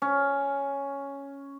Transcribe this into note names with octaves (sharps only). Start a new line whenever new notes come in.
C#4